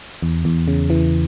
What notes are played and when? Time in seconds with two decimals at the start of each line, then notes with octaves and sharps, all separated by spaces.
0.22 E2
0.45 E2
0.68 C#3
0.90 E3